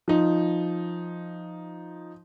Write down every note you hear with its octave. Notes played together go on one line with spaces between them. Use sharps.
F3 D#4